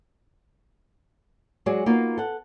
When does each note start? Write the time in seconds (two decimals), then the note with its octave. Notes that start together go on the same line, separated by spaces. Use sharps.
1.66 F#3 G#3 F#4 G#4 D5
1.86 A#3 B3 D#4 F4 F#4
2.18 A4 F#5